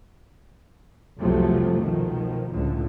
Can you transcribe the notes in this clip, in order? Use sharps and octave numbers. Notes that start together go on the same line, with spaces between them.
F1 C2 C3 F3 F#3 A3
B2 D#3 F3
C#2 A2 D3